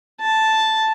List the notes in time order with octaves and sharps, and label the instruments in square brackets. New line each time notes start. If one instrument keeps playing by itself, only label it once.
[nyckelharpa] A5